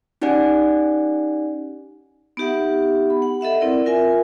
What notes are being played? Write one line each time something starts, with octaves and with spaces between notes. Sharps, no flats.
C#4 D#4 G4 D5 F#5 G#5
B3 D#4 G4 E5 F#5
B5
F#5
A4 D#5 E5 F#5
C4 E4 A#4 D5
F4 A#4 E5 G#5